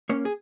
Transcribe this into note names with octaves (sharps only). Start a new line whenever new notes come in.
A#3 C#4 C#5
G#4